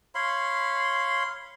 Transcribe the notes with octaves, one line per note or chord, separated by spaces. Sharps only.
C#5 F5 B5 C6